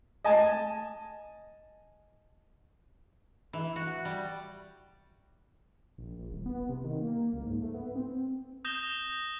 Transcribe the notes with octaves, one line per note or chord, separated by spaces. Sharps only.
D#5 G#5 A5
E3
F#4
G3
A#1
A#1
D#1
B3
C3
D#3
A#3
C#2
G#2
A3
B3
C4
D#6 G6 A#6 E7 G7